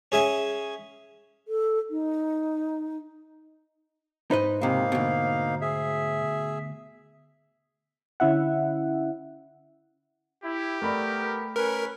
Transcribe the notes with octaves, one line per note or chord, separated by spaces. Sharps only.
C#4 G#4 E5 G#5
A4
D#4
G#2 D#4 B4 C5 D#5 B5
C#2 C3 A#3 D#4 F5
D2 B2
G#4 E5
D3 C#4 E4 E5 F#5
E4 G4
A3 B3 A#4 D5 B5
C#4 A#4 B4